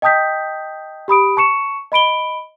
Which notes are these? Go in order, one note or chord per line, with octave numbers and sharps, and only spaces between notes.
D#5 G5 A5 D#6 G6 B6
G4 B5 D#6 D7
A5 C#6 C#7 E7
D#5 B5 D7 G7